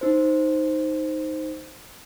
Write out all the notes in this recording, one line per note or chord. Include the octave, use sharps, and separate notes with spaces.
D#4 C5